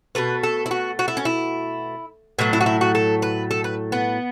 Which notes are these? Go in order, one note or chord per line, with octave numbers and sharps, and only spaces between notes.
B2 A3 B4
A4
E4
F#4
F#4
E4
C#4
E4
A2 F#3 A3 B3
E4
F#4
E4
F#4
A4
B4
A4
B4
B3